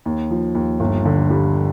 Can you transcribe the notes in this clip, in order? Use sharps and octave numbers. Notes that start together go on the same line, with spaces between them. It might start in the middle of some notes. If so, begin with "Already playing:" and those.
D#2
F3
D#2
G1
D3
G3